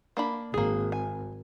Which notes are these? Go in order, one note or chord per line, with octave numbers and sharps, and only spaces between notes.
A#3 D4 B5
G#1 A#3 G#4
G#5